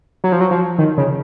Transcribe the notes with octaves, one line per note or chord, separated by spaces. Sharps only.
F#3
F3
F#3
F3
D#3
C#3